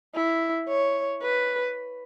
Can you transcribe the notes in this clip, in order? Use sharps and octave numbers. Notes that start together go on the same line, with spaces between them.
E4
C#5
B4